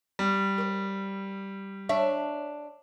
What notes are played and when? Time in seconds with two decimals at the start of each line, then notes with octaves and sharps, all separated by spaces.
0.19 G3
0.58 A#4 C5
1.89 D4 C#5 E5